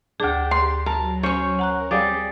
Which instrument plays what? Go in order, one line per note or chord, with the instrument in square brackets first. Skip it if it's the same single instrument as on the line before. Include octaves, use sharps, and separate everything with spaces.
[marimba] D2 G#4 [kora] D4 G5 [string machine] G4
[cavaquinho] C6
[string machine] F#3 [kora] A#4 [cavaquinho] A5
[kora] C#4 C5 [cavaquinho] C#5 C#6
[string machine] A#4 [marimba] F#5 A#5 F#6
[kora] G3 G#4 D5 [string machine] C4 G4 [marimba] F5